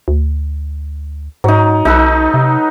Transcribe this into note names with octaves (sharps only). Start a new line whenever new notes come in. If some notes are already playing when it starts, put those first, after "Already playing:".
D2
G#2 F#3 D#4
B1 D#4 A4 B4
C3